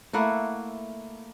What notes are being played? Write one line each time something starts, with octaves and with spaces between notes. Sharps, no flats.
A3 A#3 E4 F#5